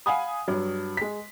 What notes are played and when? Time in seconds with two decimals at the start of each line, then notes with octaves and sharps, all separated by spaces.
0.06 F5 F#5 G#5 B5 D#6
0.48 G2 F#3
0.97 G#3 B6